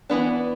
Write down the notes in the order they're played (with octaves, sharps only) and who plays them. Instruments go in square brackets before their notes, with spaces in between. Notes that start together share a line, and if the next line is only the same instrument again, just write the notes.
[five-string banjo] E3 B3 D4